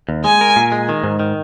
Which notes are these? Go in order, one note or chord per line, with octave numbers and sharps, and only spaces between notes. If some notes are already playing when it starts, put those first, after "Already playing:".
D#2
G#3 G#5
A#4
A#2
G#3
D#3
G#2
D#3